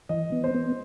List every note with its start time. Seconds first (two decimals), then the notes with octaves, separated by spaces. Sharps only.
0.09 E3 D#5
0.32 B3
0.44 C5
0.54 B3